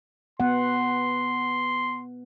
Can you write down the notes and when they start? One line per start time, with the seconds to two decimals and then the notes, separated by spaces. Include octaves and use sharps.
0.40 B3 F#5 C6